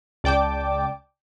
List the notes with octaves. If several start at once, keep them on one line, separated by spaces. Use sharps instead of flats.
C#2 D5 G5 A5 D6